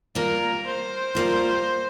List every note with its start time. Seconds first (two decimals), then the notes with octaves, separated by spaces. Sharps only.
0.15 G3 A#3 F4 A#4
0.66 C5
1.15 G3 A#3 F4